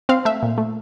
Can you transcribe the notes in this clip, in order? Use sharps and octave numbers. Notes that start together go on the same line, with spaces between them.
C4 F5
A3 E5
A#2
A3